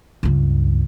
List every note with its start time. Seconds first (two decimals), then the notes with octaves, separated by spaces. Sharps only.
0.23 C#2 G2